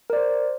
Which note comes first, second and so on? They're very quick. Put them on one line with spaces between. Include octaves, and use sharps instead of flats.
A#4 D5 C5